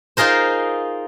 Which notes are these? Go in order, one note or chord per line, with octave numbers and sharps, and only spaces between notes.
D#4 F4 G#4 A#4 C5